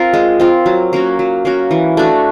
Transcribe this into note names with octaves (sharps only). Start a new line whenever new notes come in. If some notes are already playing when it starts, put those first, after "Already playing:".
Already playing: C4 F4 A#4
G#3
C4 F4 A#4
F#3
A#3 C#4 F#4
F#3
A#3 C#4 F#4
E3
A3 D4 F#4